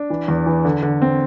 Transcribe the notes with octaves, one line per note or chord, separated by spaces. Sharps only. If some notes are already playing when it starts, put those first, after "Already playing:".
Already playing: D4
E3
E2
E3
D3
D3
C4